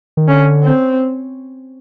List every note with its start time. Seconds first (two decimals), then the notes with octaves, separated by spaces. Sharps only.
0.17 D#3
0.28 D3 C#4
0.64 C4